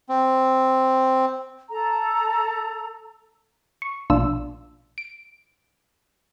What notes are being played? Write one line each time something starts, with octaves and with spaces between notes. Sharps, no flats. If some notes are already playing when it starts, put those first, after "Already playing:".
C4
A4 A#5
C#6
A#1 B2 D4 F4 E6
D7